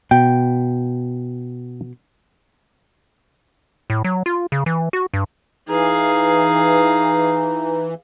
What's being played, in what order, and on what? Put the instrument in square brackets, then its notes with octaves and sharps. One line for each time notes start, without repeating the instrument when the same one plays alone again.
[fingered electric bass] B2 [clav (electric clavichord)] G5
[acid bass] A2
F#3
F4
C#3
E3
F#4
G2
[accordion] E3 [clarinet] D#4 [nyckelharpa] G#4 F5